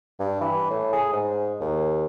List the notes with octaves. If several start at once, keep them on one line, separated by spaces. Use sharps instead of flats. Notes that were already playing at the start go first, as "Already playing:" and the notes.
G2
E3
A2
G#4
G#2
D#2